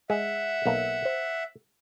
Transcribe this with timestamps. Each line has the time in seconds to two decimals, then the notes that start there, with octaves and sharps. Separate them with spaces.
0.10 G#3 E5 F#5
0.66 B1 A#3 F5
1.05 C5